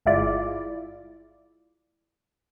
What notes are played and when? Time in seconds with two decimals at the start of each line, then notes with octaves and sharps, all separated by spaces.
0.06 G1 G#3 E4 F4 D5